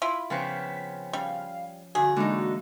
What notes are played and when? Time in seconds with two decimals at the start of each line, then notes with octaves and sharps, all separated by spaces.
0.02 E4 F4 B5
0.30 C#3 F3 B3 C4 C5 C#5 B6
1.13 G3 C#4 F5
1.95 G2 D3 F#4 G#4
2.16 D3 E3 G#3 A#3 D#4 F#4